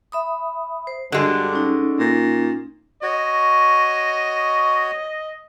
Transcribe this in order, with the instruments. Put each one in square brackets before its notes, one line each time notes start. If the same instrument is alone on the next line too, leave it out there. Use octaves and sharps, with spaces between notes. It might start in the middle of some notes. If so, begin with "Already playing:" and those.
[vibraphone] E5 B5 D#6
C5
[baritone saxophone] G2 [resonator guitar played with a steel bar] D3 G#3 [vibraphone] F#4
[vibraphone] C#4 D#4
[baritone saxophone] A#2
[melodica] F#4 C#5 [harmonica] D#5